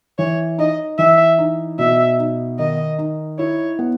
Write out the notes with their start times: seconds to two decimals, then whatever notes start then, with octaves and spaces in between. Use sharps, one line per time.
0.19 E3 C#5
0.58 D#4 D#5
0.98 E3 E5
1.39 D#4
1.79 B2 E5
2.19 D#4
2.59 D#3 D#5
2.99 D#4
3.39 E4 C#5
3.79 B3